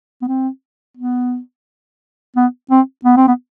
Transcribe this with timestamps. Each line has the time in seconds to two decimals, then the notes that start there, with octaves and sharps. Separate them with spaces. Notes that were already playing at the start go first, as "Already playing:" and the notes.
0.22 B3
0.28 C4
0.97 B3
2.36 B3
2.71 C4
3.05 B3
3.17 C4
3.28 B3